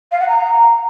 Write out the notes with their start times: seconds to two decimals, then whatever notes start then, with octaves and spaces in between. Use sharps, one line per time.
0.12 F5
0.20 F#5
0.28 A#5